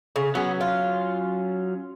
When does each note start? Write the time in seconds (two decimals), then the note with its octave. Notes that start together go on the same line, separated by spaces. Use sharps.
0.16 C#3
0.35 F#3 B3 C#4
0.61 F4